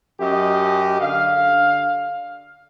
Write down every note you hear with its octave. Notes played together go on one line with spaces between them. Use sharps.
F#2 G4 D#5
D3 F5